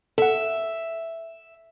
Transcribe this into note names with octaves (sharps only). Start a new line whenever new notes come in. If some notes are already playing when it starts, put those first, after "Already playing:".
A4 E5 F#5